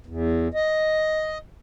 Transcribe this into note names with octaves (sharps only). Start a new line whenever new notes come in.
E2
D#5